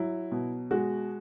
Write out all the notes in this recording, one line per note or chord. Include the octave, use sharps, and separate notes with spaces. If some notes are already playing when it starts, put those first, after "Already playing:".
Already playing: F#3 E4
B2
G#3 F#4